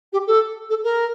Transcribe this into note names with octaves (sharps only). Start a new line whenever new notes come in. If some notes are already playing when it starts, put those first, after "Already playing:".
G4
A4
A4
A#4